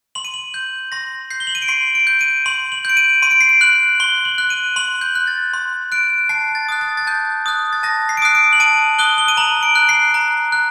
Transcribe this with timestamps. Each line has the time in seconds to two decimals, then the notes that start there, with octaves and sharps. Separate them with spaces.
0.15 C6 F#7
0.25 D#7
0.34 F#7
0.54 G6
0.92 C6 A#6
1.30 G6 C7
1.40 G7
1.47 F#7
1.55 D#7
1.62 D7
1.68 C6 C7
1.95 D7
2.07 G6
2.21 D#7
2.46 C6 F#7
2.72 F#7
2.85 G6 D7
2.97 D#7
3.22 C6 D#7
3.31 D7
3.41 C7
3.49 D7
3.61 F#6 F#7
4.00 C6 G7
4.25 F#7
4.38 F#6
4.50 D#7
4.76 C6 F#7
5.01 G6
5.15 F#6
5.27 A6
5.54 C6
5.92 F#6 D7
6.29 A5 C7
6.55 A6
6.69 D#6 F#6
6.81 A6
6.97 A6
7.07 A5 G6
7.46 D#6 F#6
7.73 A6
7.83 A5 A#6
8.09 C7
8.17 D7
8.22 D#6 F#6 C7
8.35 D7
8.53 F#7
8.60 A5 D#7
8.99 D#6 F#6 G7
9.18 G7
9.28 D#7
9.37 A#5 F#7
9.63 D7
9.76 F#6
9.89 C7
10.14 A#5
10.52 F#6